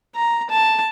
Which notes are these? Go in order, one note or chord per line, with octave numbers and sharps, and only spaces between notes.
A#5
A5